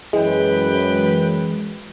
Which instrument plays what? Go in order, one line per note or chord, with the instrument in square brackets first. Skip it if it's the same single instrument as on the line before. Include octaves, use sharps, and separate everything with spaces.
[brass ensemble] F#2 B4 G5 [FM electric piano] E3 G#3